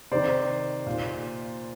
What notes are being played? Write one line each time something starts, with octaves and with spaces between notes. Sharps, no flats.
C3 D#3 C5 D5
A#2